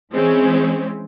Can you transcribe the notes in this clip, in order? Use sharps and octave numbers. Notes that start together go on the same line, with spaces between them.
E3 G#3 C4 C#4